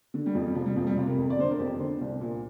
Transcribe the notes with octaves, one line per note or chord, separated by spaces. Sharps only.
D3
G3
F2 F3
G3
C3 F3
G3
F2 F3
G3
C3 F4
A#4
F2
D5
D3 C5
A#4
F2 G4
D3 C5
C2
A#2